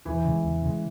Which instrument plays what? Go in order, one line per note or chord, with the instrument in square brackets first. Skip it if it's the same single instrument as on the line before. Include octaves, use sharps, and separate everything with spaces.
[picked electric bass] E2 [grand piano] E3
[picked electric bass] C#3 G#3
E2
C#3 G#3